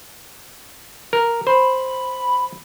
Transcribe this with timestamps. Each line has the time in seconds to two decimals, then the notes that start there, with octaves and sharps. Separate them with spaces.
1.13 A#4
1.47 C5 B5